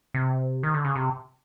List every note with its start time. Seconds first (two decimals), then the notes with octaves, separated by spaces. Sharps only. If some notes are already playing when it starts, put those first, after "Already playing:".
0.14 C3
0.63 D#3
0.74 D3
0.85 C#3
0.95 C3